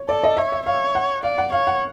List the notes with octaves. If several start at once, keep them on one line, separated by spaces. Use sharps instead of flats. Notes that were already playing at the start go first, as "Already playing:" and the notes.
Already playing: C#5
A4 D5
D#5
C#5 E5
E5
C#5 F5
F#5
D5 F5
F#5
C#5 F5
F#5